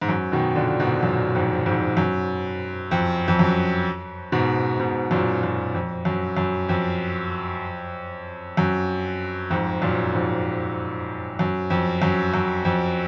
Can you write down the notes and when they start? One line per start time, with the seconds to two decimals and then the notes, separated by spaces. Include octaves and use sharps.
0.01 G#2
0.09 F#2
0.32 B2 D#3
0.56 A#2 D3
0.80 G#2 B2
1.03 F#2 A#2
1.35 F2 G#2
1.66 F2 G#2
1.97 F#2
2.91 F2
3.28 F2
3.39 F#2
4.32 G#2 B2
4.80 G#2 B2
5.11 F#2 A#2
5.43 F#2
5.74 F2
6.05 F#2
6.37 F#2
6.69 F2
8.57 F#2
9.50 F2 G#2
9.82 F#2 A#2
10.14 F2 G#2
11.39 F#2
11.70 F2
12.02 F#2
12.34 F#2
12.65 F2